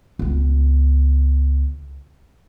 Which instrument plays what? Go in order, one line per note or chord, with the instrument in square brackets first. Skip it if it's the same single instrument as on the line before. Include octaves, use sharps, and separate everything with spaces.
[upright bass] C#2 B3